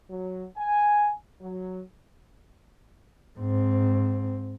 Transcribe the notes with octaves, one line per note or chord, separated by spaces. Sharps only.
F#3
G#5
F#3
G#2 C4